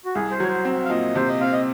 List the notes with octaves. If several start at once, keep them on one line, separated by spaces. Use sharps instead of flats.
F#4
C2 G#4
C5
F#3 C#5
C5
C4
F5
A#2 D#5
C3 C5
D#5
C4 F5
D#5